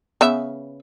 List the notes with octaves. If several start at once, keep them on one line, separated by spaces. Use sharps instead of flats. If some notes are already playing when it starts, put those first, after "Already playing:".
C#3 B3 E5